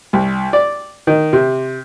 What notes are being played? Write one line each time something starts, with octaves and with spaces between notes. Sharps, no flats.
C2
D5
D#3
C3